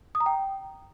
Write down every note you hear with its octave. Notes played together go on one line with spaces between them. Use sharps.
D#6
A#5
G5